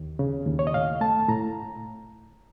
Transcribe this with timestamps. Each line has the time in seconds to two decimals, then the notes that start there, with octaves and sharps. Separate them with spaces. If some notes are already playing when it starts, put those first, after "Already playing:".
Already playing: D#2
0.19 C#3
0.46 D#2
0.59 C#5
0.67 D#5
0.74 A2 F5
1.01 A3 A5
1.29 A2 A#5